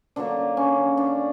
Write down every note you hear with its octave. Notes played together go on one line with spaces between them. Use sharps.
D3 F#3 A#3 D4
C#4
D4